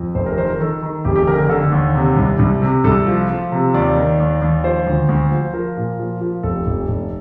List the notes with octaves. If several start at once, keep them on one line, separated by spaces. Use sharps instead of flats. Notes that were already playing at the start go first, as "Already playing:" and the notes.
Already playing: F2
F1 C5
A#4
D#3 C5
A#4
D#3 A4
D#3
F1 G4
G4
D3 A#4
A#4
D3 A4
D#2
C3
C2
C2
C3
C2 A4
F3
F3
C3
D#2 D5
D#3
D#2
D#2
F3 C5
D2
D2
F3
F3 A#4
A#2
F3
F3
F1 A4
F1
F1